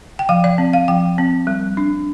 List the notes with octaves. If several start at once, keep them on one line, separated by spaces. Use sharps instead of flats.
G5
F3 F5
D5
C4
F5
F3 G5
C4
G3
D4